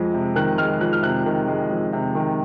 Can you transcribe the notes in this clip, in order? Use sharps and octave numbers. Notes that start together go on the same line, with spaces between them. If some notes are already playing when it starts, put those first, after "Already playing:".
Already playing: F2 G#3
C3
D#3 F#6
G#3 F6
F2 F#6
F6
C3 F#6
D#3
G#3
F2
C3
D#3